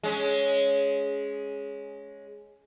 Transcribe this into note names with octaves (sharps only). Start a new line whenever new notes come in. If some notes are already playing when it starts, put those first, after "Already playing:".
G#3 C#4